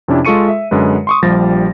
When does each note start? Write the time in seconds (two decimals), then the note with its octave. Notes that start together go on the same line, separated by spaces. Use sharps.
0.08 F2 C3 C#4 D4 E4
0.25 G#3 F4 A4 C#6 C#7 D#7
0.49 E5
0.71 F#2 D3 G#3 B4
1.07 C6 C#6 D#6
1.23 A#1 F3 G3 G4 A6 A#6